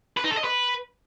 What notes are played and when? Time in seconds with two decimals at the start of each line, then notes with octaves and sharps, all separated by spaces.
0.17 B4
0.24 D#4
0.31 A4
0.37 D#5
0.44 B4